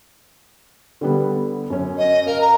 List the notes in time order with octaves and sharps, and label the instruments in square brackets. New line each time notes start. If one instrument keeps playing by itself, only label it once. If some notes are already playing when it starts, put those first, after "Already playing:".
[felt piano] D3 G3 B3
F#2 C#4
[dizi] D#5
[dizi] A#4 [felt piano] F5
[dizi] A#5